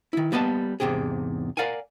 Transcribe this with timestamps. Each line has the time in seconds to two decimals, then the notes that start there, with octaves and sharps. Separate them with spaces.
0.13 D#3 E4
0.32 G3 A#3 B3 D#5 F#5 A5
0.80 E2 G#2 C3 G4 G#4
1.57 A#4 D5 F5 F#5 G#5